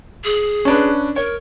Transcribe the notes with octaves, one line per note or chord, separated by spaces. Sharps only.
G#4
C#4 D4 B4
A#4 C#5